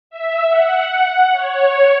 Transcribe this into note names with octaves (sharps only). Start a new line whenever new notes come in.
E5
F#5
C#5